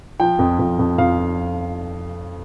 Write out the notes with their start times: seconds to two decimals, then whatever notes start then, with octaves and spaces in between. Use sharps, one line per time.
0.20 F3 G5
0.39 F2
0.59 F2
0.79 F2
0.98 F2 F5